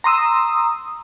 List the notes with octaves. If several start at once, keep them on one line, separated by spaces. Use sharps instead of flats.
A#5 C6 D#6 E6